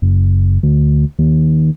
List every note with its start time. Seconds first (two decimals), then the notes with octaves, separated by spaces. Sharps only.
0.02 F#1
0.63 D2
1.19 D#2